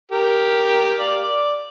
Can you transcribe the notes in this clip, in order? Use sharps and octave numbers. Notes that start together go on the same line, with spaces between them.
G4 A#4
D5 F5
D5